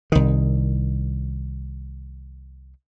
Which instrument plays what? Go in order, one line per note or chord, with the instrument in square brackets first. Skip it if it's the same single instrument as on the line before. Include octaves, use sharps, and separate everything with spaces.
[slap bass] C2 D#3